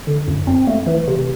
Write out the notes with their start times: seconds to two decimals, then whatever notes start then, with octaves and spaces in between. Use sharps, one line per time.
0.07 D3
0.28 F#2
0.47 C4
0.67 A3
0.86 E3
1.08 C3